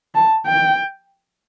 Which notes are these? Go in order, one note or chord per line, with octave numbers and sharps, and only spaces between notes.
A5
G5